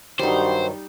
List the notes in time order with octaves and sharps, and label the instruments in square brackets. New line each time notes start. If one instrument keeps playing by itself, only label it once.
[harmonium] G2 D#3 F#3 [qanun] G3 D#4 [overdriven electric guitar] C5